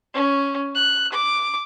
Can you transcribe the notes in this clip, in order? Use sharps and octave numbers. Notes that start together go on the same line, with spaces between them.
C#4
F#6
D6